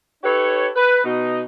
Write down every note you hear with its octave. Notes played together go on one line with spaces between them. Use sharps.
D#4 G4 A4 B4 C#5
B4
B2 D#4